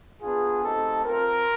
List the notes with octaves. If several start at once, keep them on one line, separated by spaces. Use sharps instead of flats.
B3 D4 F4 G#4
A3 C4 D#4 G4 A4
C4 F4 A#4